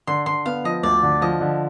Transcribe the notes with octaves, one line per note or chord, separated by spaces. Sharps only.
D3 C6
D3 C6
B3 F5
F3 D#5
D2 D5
D3
F3 D#5
D3